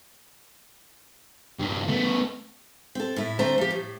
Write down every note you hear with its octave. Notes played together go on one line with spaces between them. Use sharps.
G2 A#2
A3 B3
C4 A4
A2 E4
D2 A3 C4 C5 A#5
F3 G4
A2